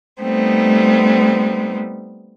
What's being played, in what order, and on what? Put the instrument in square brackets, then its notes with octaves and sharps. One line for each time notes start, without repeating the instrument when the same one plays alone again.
[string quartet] G3 A3 B3 C4 D#4